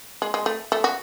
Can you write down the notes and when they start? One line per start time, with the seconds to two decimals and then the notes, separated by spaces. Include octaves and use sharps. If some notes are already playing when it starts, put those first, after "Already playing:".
0.22 G#3
0.34 G#3
0.46 A3
0.72 A3
0.84 F#4